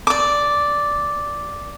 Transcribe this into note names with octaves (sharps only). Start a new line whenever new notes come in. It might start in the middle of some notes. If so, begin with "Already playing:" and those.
D5 D6